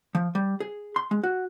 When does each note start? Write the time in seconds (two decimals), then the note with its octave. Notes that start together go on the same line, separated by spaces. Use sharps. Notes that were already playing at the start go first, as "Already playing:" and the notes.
0.15 F3
0.35 G3
0.60 G#4
0.96 C6
1.11 G#3
1.23 F#4